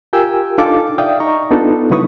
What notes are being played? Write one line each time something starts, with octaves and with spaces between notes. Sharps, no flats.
F4 G4 A#4 G5 G#5 E6
D4 D#4 F4 A4 F5 D6
D5 E5 F5 G5 D#6
D#4 D#5 A#5 C#6
B3 D4 D#4 F4 A4
C#3 F#3 E4 B4 C#6 D#6